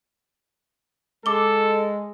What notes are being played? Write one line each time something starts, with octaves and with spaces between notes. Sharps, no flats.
G#3 A4 D6 G7